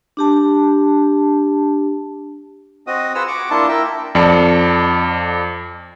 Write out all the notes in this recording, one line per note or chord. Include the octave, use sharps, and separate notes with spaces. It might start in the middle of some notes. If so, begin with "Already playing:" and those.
D4 G4 A5
C4 F#4 D#5 D#6
F4 G#4 B4 F#5 E6 F6
F#5 C#6 D6
A#3 D4 E4 F4 A5
E4 A#4 E5 G5
F2 D5 A5 C#7